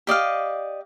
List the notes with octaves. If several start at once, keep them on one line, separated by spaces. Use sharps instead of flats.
G4 D5 D#5 F5